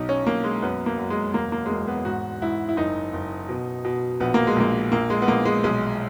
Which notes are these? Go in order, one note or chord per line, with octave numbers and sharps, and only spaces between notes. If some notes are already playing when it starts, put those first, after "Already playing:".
Already playing: B1 D#4
C#4
B1 A#3
G#3
F#2 B3
A#3
F#2
G#3
E1 A#3
A#3
G#3
E1 A#3
B3
G#2 F#4
G#2 E4
E4
F#1 D#4
F#1
B2
B2
A#1 B3
A#3
G#3
A#1 A#3
A#1 A#3
G#3
B3
A#1 A#3
G#3
B1 G#3